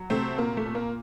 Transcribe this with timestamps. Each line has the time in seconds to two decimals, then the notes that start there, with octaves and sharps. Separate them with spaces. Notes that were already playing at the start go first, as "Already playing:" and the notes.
Already playing: F#3
0.10 C3 A3 C4
0.38 A#2 A#3
0.57 A3
0.65 A#2
0.75 A#3